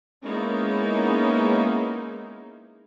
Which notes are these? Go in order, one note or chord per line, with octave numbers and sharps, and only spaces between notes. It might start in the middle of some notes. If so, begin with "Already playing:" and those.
G#3 A#3 B3 C#4 D#4 E4